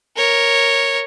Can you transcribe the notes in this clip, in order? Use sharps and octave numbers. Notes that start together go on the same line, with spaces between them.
A#4 C#5